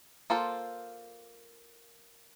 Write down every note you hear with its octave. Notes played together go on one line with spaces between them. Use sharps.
A#3 F4 A4 C5